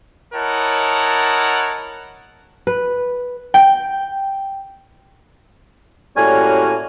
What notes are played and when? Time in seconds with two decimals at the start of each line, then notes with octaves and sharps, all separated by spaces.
0.35 E4 A#4 C#5 D#5 F#5 A5
2.67 B4
3.54 G5
6.16 A2 G3 A#3 C#4 F#4 G#5